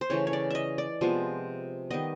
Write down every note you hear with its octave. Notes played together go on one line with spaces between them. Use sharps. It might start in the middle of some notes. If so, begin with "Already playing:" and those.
C5
C#3 E3 A3 C#5
C#5
D5
D#5 E5
D5
C3 F3 G#3 B3
D#3 G3 B3 D#5